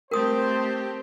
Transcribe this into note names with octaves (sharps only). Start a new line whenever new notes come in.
A3 C4 G4 A#4 C5 D#6